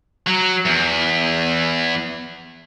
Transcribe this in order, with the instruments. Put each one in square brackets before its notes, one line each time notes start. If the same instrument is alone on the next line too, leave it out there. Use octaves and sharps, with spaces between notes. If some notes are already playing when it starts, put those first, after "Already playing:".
[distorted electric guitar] F#3
E2